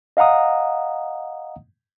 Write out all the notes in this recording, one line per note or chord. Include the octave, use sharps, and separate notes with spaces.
D#5 F5 F#5 A#5 D#6